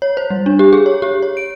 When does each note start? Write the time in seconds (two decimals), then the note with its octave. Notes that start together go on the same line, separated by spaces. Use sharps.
0.02 C#5
0.17 C5
0.30 G3
0.46 D4
0.59 G4
0.73 G#4
0.86 C#5
1.02 G4
1.23 C#5
1.37 D7